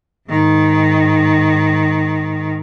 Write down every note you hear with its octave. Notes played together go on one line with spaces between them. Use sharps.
G#2 D#3